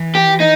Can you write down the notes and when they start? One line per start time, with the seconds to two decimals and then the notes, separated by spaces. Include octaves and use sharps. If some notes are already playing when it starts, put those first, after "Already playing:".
Already playing: E3
0.15 G4
0.40 D#4